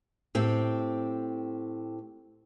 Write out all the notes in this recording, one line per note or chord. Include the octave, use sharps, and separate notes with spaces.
A2 C4 G4